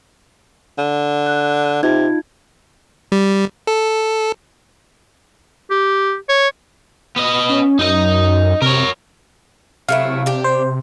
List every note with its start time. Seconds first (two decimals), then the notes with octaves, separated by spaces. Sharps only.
0.78 D3
1.26 F#6
1.83 C3 D#4 F4 G#6
3.12 G3
3.67 A4
5.70 G4
6.29 C#5
7.16 B3 D#5
7.49 C#4
7.79 F#2 D#4 D#5
8.62 C3 A#4 C#5
9.89 C3 F#3 A3 E4 F5
10.26 D4 G4
10.44 C5